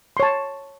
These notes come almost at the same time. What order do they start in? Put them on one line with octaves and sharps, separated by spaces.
C6 C#5 A5